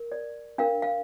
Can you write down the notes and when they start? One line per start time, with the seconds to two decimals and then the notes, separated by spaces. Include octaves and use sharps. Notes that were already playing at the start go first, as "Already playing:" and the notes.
Already playing: A#4
0.12 D5
0.58 D4 A#4 F5
0.82 F5